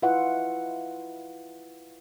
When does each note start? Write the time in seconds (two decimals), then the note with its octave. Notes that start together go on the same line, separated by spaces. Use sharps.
0.02 E4 F4 B4 E5 F#5